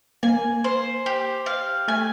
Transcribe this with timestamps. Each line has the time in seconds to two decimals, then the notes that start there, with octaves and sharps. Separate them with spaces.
0.23 A#3 G#5
0.64 C5
1.06 G4
1.46 F5
1.88 A3 G#5